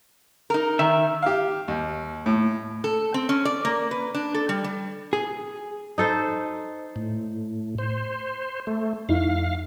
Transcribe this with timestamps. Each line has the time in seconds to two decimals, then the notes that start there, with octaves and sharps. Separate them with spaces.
0.50 D#4 A#4
0.79 D#3 E5
1.22 G4 F5
1.68 D#2
2.26 A2
2.84 A4
3.14 C4
3.29 C#4
3.45 D5
3.65 A#3
3.91 B4
4.15 D4
4.34 A4
4.49 G3
4.64 G3
5.13 G#4
5.98 D#4 A4 C5
6.96 A2
7.79 C5
8.67 A3
9.09 F2 D#4 E4 F5